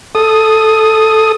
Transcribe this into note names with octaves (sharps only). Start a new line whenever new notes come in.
A4 D#6